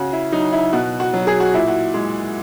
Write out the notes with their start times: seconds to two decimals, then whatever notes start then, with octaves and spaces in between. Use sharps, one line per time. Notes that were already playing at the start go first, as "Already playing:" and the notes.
Already playing: C#3 F#4
0.13 E4
0.32 F#3 D#4
0.52 E4
0.73 B2 F#4
1.00 F#4
1.13 F#3
1.27 G#4
1.40 F#4
1.53 A#2 E4
1.68 F#4
1.94 G#3